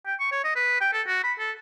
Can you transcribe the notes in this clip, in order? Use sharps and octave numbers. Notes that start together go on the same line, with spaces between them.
G5
C#6
C#5
D#5
B4
G5
A4
F#4
B5
A4